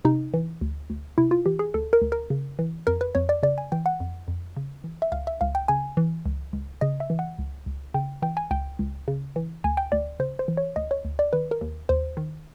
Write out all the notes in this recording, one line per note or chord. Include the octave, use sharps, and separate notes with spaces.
C3 D#4
E3
D2
D2
C3 E4
F4
E3 G4
G#4
D2 A4
A#4
D2
A#4
C#3
E3
F2 A#4
B4
F2 C#5
D5
C#3 D5
G#5
E3 G5
F#5
F2
F2
C#3
E3
E5
C#2 F5
E5
C#2 F5
G5
C#3 G#5
E3
C#2
C#2
C#3 D#5
E5
E3
F#5
C#2
C#2
C#3 G5
E3 G5
G#5
C#2 G5
C#2
C#3
E3
D2 G#5
G5
D2 D5
C#3 C5
C5
E3
C#5
D2 D#5
C#5
D2
D5
D#3 B4
A#4
D#2
D#2 C5
D#3